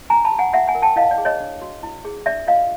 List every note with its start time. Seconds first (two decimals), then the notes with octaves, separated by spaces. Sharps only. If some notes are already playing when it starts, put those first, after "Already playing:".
0.10 D4 G#5 A#5
0.25 A5 B5
0.32 G4
0.38 F#5 G#5
0.53 F4 E5 F#5
0.67 F#5 G#5
0.75 A#4
0.82 G5 A5
0.96 E4 D#5 F5
1.11 D5
1.18 G#4
1.25 C#5 D#5
1.40 D4
1.62 F#4
1.83 E4
2.05 G#4
2.26 D4 D5 E5
2.48 F4 D#5 F5